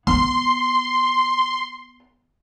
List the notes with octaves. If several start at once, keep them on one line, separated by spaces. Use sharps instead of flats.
B3 C6